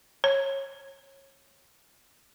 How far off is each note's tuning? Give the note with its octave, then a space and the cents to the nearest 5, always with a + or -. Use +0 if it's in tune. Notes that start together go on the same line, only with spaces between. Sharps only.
C#5 -25